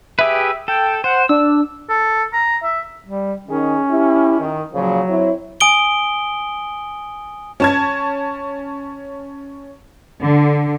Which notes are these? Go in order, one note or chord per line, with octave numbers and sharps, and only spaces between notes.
G4 G#4 B4 E5
A4 G5
C5 F#5
D4 E6
A4
A#5
E5
G3
D#3 C#4 G#4
E4 G4
D#3
A#2 C#3 F3 F#3
C4 E4 C#5
G#5 D#6 D7 G7
C#4 A5 G#6
D3